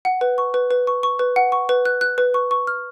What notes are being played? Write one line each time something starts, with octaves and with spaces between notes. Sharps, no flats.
F#5
B4
C#6
B4
B4
C#6
C#6
B4
F#5
C#6
B4
F#6
F#6
B4
C#6
C#6
F6